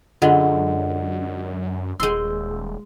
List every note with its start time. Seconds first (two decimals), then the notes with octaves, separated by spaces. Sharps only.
0.22 F#2 D3 G#3 F4 D#5 F#5
2.00 D#1 G#3 C6 E6 G6